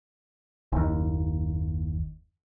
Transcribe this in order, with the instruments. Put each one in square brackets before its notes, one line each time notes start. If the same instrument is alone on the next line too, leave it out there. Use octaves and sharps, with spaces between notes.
[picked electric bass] F#1 D#2